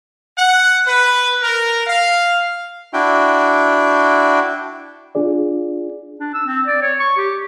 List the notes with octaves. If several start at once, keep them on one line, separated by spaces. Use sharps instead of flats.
F#5
B4
A#4
F5
D4 E4 F#4 G5
D4 F4 G#4 D5
D4
E6
C4
D5
C#5
C#6
G4